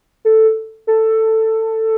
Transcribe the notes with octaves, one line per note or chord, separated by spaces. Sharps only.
A4
A4